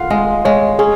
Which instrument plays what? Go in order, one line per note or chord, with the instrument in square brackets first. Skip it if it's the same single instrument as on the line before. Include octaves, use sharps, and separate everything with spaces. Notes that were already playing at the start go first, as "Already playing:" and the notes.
Already playing: [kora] F4 [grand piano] F5 F#5
[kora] G#3 [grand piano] D#5
[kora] G#3 [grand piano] C#5
[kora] C#4 [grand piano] G#4